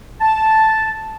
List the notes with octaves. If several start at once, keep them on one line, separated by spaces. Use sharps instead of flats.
A5